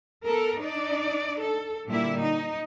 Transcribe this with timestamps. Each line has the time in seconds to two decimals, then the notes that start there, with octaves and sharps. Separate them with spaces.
0.24 B3 A4 A#4
0.60 D4 D#4 D5
1.41 A4
1.88 A#2 D3 G3 A#3 E4
2.22 D#4